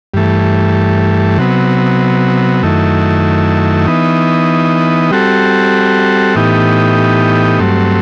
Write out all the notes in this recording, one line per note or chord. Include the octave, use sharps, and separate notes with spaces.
G2 E3 A3
C3 F#3 B3
F#2 D#3 A3 E4
E3 B3 D#4
G3 C4 F#4 A4
A2 E3 B3 D#4 G4
G2 F#3 A3 C4